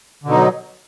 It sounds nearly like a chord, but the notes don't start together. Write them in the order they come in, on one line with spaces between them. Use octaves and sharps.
D3 B2 D#4 F#3